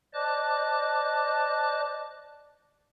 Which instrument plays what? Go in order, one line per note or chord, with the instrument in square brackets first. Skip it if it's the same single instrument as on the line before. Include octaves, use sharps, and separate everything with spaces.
[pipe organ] C5 D5 D#5 A5 D6 F#6